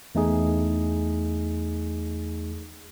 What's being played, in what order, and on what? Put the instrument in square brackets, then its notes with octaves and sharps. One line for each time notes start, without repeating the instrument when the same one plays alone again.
[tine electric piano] E2 A3 D#4 G#4